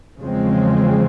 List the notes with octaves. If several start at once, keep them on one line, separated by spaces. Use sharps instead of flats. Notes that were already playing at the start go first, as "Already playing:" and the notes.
E2 C#3 F3 G#3 C4